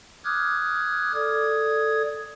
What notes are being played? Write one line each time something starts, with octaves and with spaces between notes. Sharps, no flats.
D6 D#6 F6 F#6 G#6
A4 D5 D#6 G#6